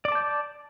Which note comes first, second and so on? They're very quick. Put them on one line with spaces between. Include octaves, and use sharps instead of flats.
D5 D6 A5 G6